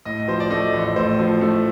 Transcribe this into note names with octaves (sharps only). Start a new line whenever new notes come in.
A2 D#5
F3 C5
D5
A3 D#5
A1
A2 C5
F3
A3